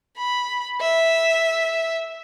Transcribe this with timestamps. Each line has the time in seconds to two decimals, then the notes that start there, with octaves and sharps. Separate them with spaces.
0.17 B5
0.81 E5